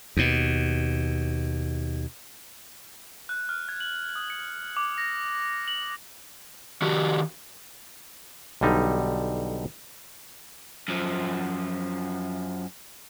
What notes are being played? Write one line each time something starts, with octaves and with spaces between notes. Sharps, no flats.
D#2 B2
F#6
F6
G#6
F#7
D#6
C#7
D6
A#6
F#7
D#3 F#4 G4
B1 D3 G3 D#4
F#2 F3